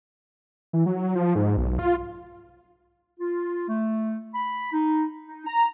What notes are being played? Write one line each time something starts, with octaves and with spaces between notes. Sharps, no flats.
E3
F#3
F3
G#2
B1
F4
F4
A3
B5
D#4
D#4
A#5